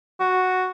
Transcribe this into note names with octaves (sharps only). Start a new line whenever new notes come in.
F#4